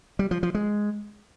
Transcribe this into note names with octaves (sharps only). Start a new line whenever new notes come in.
G3
F3
F3
G#3